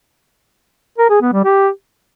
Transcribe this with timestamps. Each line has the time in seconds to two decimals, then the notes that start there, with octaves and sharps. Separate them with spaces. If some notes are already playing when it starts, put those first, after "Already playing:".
0.98 A#4
1.10 G#4
1.21 B3
1.33 G3
1.44 G4